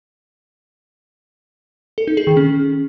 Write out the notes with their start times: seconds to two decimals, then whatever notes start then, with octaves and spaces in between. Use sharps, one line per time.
1.98 A4
2.07 D#4
2.17 G#4
2.27 D#3
2.37 C#4